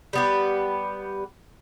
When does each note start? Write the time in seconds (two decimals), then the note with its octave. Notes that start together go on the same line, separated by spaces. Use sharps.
0.13 G3 B3 G4